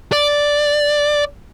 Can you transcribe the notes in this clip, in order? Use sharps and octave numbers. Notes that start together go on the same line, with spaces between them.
D5